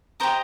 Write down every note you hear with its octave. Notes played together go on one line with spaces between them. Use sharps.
G4 C5 D#5 A#5